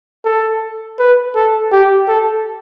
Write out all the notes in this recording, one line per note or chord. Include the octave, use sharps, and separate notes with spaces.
A4
B4
A4
G4
A4